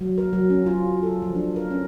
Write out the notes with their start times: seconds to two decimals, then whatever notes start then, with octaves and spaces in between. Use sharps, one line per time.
0.01 F#3
0.18 A#4
0.33 F#3
0.50 C#4
0.66 F4
1.03 A4
1.22 F3
1.35 D4
1.56 A#4
1.71 C#4